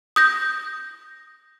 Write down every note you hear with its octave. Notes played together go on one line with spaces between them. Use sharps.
D#6 G6 A#6